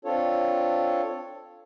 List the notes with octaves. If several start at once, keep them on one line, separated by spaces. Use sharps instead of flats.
C4 D4 F4 A4 C#5